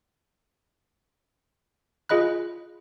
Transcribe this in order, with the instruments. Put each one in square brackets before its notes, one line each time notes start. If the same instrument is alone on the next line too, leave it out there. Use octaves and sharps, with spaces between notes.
[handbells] F4 G#4 D#5 B5 F#6